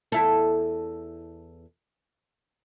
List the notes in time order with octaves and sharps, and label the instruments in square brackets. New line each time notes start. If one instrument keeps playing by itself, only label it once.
[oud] E2 E4 A4